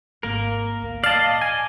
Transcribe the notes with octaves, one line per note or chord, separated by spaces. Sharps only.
G#1 A#3 A#4
D2
D5 D#5 F5 A5
A#1
G#5